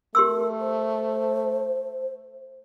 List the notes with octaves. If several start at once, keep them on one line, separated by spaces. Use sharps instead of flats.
A3 G4 A#4 C6 E6
C5